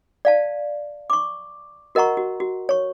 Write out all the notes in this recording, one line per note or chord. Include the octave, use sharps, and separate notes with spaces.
D5 F5 A5
C#6 D6
F#4 A#4 D#5 F#5 A#5 C#6
F#4
F#4
C#5 C#6